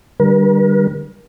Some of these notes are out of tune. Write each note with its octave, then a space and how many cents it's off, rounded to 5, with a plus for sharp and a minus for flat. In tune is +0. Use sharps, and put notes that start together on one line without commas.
D3 +30 G3 +0 A#4 +45